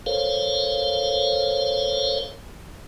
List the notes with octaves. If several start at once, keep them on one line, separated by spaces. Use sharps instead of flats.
A4 A#4 C5 C#5 F5